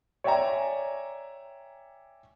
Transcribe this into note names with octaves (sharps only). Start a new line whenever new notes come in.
C#5 D5 E5 G5 G#5 A#5